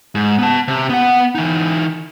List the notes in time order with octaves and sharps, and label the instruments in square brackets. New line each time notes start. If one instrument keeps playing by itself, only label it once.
[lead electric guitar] G#2
B3 A5
C3
B3 F#5
E3 D#4